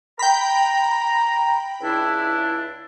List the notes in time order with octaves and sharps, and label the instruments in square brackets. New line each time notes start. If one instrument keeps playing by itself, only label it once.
[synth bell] G5 B5 [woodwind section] A#5
[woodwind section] C#2 D4 E4